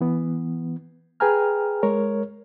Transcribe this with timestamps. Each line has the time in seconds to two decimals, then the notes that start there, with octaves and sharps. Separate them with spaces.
0.01 E3 B3
1.20 G#4 B4 G5 G#5 A#5 F6
1.83 G#3 A#4 C#5